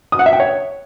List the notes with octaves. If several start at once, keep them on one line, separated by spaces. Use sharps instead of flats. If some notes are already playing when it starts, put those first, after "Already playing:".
D#6
F#5
E5
G5
C#5